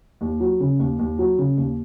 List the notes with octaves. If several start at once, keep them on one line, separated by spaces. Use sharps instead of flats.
D#2
F#3
C#3
D#2
D#2
F#3
C#3
D#2